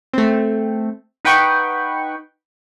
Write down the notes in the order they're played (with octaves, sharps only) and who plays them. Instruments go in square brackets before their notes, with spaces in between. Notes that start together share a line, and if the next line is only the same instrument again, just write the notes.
[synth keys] A3 C4
D#4 B4 F#5 G5 B5 C#6